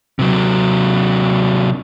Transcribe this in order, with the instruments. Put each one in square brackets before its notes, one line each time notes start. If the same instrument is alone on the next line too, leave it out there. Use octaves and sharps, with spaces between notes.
[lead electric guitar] C3 F#3